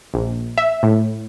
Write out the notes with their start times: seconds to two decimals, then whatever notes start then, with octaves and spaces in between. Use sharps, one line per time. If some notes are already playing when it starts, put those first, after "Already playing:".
0.14 A#1
0.58 E5
0.83 A2